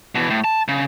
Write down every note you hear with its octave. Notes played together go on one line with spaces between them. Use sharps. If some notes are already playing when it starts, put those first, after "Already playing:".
B2 E3
A2
A5
C#3